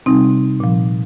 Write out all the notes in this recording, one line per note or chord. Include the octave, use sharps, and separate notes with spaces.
C3 G3 C4 D#4
A#2 F3